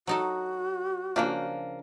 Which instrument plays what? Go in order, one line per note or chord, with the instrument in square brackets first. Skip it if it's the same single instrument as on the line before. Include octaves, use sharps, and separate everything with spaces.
[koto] F#3 D#4 A4 [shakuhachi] F#4
[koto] C#3 D4 [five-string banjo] F3 A#3